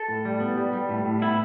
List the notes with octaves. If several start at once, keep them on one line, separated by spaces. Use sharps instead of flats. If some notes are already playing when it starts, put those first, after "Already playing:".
Already playing: A4
A2
G3
B3
G3
G3
A2
A2
B3 E4